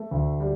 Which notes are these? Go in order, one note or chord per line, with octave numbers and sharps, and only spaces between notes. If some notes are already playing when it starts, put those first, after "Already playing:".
Already playing: A3
D2
G3